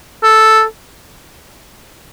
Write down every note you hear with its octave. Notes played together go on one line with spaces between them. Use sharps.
A4